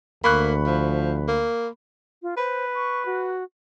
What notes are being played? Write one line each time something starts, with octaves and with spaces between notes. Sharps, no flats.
D2 A#3 B5 C#6 F#6
F3
A#3
F4
B4 C5
C#6
F#4